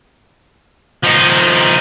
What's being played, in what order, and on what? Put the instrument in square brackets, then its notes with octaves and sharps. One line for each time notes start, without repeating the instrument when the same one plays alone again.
[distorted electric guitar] F3 D#4